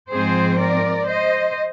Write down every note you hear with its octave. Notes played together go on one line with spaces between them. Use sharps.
G#2 F3 C4 G#4 C5
A#4 D5
C5 D#5